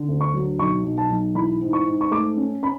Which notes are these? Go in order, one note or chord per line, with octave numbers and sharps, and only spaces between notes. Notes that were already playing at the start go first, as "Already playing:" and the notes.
Already playing: D3
D2
C#6
F#3
B1 C#6
B1
A5
B1
E3 B5
G#2
C#6
G#2
C#6
A3 D6
C#4
C#4 B5